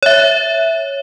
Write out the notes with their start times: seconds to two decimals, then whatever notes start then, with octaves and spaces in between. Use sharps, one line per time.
0.03 C#5 E5